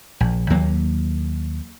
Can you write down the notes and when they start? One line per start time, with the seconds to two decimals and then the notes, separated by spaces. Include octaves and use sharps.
0.20 A#1
0.50 D#2 F#3 A#3